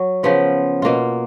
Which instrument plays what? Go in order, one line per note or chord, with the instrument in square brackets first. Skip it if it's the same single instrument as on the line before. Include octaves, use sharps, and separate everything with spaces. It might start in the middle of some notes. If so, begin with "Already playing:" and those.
Already playing: [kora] F#3
C#3 F3 B3 F4
B2 A#3 F4